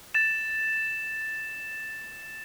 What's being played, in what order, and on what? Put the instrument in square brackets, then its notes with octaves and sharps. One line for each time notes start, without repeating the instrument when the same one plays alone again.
[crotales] A6 E7